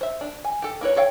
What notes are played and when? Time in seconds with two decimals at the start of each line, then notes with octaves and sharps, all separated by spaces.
0.01 C5 E5
0.21 D4
0.44 G#5
0.62 G4 A4
0.81 A#3 E4 B4 C#5
0.96 A4 C#5 F5 G5